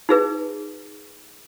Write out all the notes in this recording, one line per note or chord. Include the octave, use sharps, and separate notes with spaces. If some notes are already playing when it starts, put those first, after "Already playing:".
D#4 G#4 B4